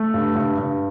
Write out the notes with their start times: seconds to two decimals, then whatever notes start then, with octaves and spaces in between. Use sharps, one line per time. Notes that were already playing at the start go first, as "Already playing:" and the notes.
Already playing: A3
0.14 G2
0.35 G2
0.58 G2